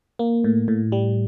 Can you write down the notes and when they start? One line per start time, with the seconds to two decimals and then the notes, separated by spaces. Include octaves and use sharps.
0.19 A#3
0.44 A2
0.68 A2
0.92 G3